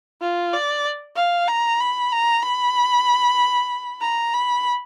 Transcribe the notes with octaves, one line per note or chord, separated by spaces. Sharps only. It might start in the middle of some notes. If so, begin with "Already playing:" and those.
F4
D5
F5
A#5
B5
A#5
B5
A#5
B5